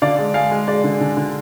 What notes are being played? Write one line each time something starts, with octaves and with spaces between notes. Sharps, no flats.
D3 D5 F5
G#3
G#3 F5 G#5
G#3
G#3 D5
D3
D3
D3